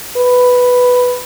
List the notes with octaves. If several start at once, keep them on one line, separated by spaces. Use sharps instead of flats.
B4